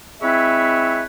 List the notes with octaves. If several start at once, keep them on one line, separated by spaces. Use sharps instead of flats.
G#3 C4 E4 B4 C#5 E5